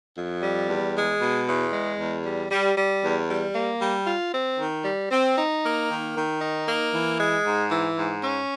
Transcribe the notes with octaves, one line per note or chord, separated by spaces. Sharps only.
F2
G3
E2
G#3
B2
E2
G#3
E2
G3
G3
G3
E2
G3
A#3
G3
F4
C4
D#3
G3
C4
D#4
A#3
D#3
D#3
D#4
A#3
E3
G#3
G#2
E3
G#2
C#4